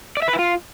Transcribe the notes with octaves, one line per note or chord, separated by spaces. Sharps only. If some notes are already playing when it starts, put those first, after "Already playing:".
D5
E5
B4
E4
F4